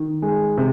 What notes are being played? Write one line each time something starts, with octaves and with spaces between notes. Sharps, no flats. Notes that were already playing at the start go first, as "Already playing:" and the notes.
Already playing: D#3
G#3
C3